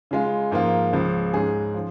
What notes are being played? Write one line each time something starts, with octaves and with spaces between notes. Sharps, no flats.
C#3 G#3 F4
G#2 F3 A#3 F4
C#2 C#3 F3
G#2 G#3 C#4 G#4
F3